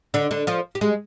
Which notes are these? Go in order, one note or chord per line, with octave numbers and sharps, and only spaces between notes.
D3 D4
D3 D4
F3 F4
G4
G#3 G#4